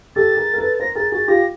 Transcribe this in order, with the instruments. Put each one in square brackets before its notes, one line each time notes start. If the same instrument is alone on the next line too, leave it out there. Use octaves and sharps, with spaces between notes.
[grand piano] G4 A4 [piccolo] A6
[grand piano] G#4 A#4
A#4
A4 B4
[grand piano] A#4 C5 [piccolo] A#6
[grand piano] G#4 A#4 [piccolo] A6
[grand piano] F#4 G#4 [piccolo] A6
[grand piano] F4 G4 [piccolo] A#6